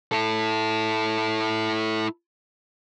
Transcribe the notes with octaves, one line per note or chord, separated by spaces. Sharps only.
E4 A4